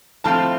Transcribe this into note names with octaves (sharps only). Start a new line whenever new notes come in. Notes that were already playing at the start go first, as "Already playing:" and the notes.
A2 F3 A3 C4 F4 A5